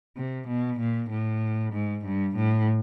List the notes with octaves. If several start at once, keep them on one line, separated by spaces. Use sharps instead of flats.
C3
B2
A#2
A2
G#2
G2
A2